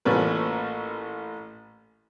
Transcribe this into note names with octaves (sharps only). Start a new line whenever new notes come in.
A1 A#2 A3 C#4 A#4 B4